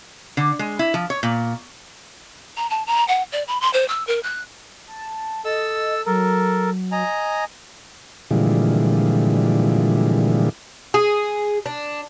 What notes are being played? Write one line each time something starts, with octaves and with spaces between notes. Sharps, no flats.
D3
G#3
E4
F3
C#5
A#2
A#5
A5
A#5
F#5
D5
B5
C6
C5
E6
A#4
F#6
A5
A4 D#5 E6
F#3 A4 A#4
D#5 G#5 A#5
A#2 D3 E3 F3 G3 G#3
G#4
D4